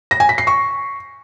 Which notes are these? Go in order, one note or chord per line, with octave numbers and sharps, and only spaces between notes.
A#6
G#5
B6
C7
C#6